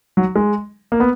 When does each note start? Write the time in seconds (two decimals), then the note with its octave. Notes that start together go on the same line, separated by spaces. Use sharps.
0.17 F#3
0.36 G#3
0.92 A#3
1.00 B3